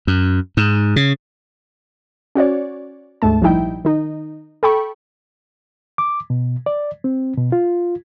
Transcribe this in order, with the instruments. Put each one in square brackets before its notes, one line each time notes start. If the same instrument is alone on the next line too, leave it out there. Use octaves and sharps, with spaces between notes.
[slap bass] F#2
G#2
C#3
[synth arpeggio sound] C#4 F#4 C#5 D5
D2 G#2 A3 A5
A#1 F3 G3 D#4 E4 G5
D#3 D#4
A4 G5 B5 C#6
[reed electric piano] D6
B2
D5
C4
B2
F4